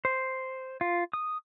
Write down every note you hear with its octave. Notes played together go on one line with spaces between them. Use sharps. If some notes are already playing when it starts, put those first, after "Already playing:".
C5
F4
D#6